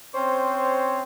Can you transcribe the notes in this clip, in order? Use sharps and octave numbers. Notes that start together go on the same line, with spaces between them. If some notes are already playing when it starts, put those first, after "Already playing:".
C4 C#4 C5 C#5